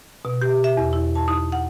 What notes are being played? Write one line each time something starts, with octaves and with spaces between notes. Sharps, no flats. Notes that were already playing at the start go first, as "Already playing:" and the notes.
B2
G4
E5
E2
E4
A5
D#4
F#5